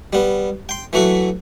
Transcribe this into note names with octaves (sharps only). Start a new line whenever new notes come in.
G3 B3
G5 C6
E3 F#3 A3 F#4